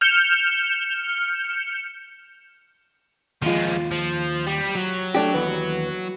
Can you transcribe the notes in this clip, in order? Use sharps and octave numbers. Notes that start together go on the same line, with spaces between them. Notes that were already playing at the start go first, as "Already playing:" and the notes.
F6 G6 C#7 E7
D#2 F3 G#3 F4
F3
G3
F#3
A3 D4 G4
D#2 E3 B3